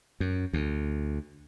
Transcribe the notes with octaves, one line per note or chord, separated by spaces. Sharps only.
F#2
D2